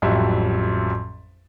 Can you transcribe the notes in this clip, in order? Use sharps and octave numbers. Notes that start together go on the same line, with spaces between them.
A1 F2 F#3 G3 E5